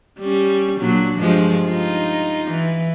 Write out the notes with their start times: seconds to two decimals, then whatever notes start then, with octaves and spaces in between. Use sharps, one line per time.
0.19 G3 C#4
0.80 A#2 F#3 D4
1.18 G2 F3 G#3
1.67 D#4 F4
2.51 E3